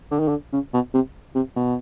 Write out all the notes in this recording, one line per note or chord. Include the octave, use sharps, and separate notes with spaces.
D3
D#3
D3
C#3
B2
C3
C3
B2